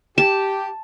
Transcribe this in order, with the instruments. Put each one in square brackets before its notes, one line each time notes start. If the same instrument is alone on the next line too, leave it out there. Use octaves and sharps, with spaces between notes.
[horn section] G4 [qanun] A5